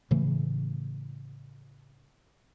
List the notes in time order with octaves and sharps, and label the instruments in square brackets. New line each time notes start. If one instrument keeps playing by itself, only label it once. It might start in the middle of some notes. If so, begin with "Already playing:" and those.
[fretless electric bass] A2 C#3 E3 A3